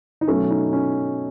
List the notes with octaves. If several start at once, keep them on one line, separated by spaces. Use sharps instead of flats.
D#4
B2 F#3 A3 C#4
D#4
C#4